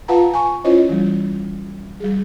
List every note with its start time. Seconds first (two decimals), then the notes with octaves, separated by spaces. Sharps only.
0.08 F4 B4 F5 F#5 A5 A#5
0.33 G#5 C#6
0.64 C#4 E4 F4 C5 C#5 D#5
0.89 E3 G3
2.00 G3 G#4